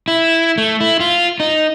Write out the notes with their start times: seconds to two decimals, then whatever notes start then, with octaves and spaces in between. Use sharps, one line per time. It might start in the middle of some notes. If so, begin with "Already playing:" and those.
0.08 E4
0.58 A3
0.81 E4
1.00 F4
1.40 D#4